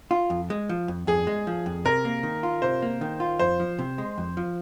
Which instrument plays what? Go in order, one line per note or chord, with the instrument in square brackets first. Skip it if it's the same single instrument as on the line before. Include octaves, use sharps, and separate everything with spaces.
[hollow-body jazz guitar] F4
F2
G#3
F3
F2
[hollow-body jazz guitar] F2 [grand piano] G#4
[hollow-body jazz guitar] G#3
F3
F2
[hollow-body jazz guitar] C3 [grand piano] A#4
[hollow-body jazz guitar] A#3
D#3
F4
[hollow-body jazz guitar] C3 [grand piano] C5
[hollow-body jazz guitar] A#3
D#3
F4
[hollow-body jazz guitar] F2 [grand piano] C5
[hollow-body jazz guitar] F3
C3
G#3
F2
F3